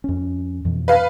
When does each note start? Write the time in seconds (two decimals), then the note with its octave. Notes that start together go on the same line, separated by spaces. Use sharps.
0.04 F2 C#4
0.65 F2 B2 E3
0.88 B4 F5